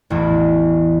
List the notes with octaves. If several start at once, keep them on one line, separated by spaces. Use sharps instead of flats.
A1 E2